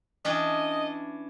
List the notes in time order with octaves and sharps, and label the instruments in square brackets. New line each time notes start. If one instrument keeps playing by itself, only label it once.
[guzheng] E3 C#4 D4 [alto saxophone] D#5